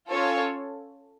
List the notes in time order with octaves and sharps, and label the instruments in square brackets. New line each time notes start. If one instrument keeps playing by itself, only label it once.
[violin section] C#4 F4 A4 C#5